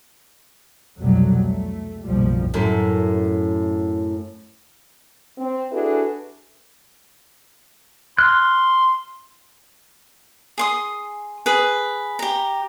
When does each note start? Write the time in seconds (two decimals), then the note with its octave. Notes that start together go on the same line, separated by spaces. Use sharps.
1.00 F1 C2 B2 F#3 G3 A3
1.38 A3
2.04 F#1 B1 A#2 F3 G3
2.54 F#2 A2
5.38 C4
5.71 D4 E4 F#4 G#4 A4 B4
8.19 C6 F6 F#6
10.58 G#4 C6 D#6
11.46 G#4 B4
12.19 G4 A#5